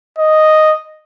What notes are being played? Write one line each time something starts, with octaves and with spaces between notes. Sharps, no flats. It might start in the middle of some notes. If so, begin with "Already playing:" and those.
D#5